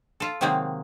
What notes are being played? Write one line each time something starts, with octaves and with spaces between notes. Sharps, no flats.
F4 A4
C3 D#3 F#3 G#3 A#3 C4